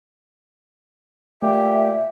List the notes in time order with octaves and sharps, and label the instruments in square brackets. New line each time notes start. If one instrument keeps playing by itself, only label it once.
[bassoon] A#2 [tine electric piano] A3 [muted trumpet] G4 [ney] E5